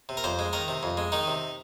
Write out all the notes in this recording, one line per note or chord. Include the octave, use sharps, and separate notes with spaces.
C3
A#4
F2 C5
G#3
D#3 A#4
C3
F2
G#3
D#3 D#4
C3